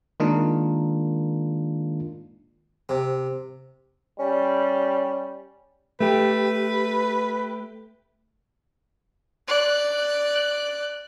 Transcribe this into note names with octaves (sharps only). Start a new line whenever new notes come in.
D#3 G#3 A#3 D4 D#4 F4
C3
G3 C#4
A3 G4 B4
D5 F#6